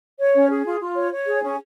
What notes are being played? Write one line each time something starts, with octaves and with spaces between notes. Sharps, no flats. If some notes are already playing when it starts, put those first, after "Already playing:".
C#5
C#4
G#4
F4
F4
C#5
C#5
G#4
C#4